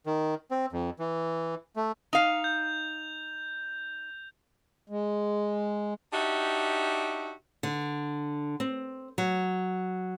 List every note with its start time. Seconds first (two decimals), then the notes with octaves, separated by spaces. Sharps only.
0.06 D#3
0.51 C4
0.72 F2
0.99 E3
1.76 A3
2.13 D#4 F5 F7
2.44 G6
4.90 G#3
6.13 D4 D#4 F#4 G4 E5
7.63 D3
8.60 C4
9.18 F#3